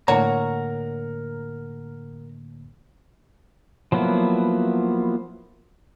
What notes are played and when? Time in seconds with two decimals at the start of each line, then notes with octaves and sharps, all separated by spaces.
0.08 A2 D3 A#3 A#4 C#5 F#5 A#5
3.92 F3 F#3 A#3 B3 E4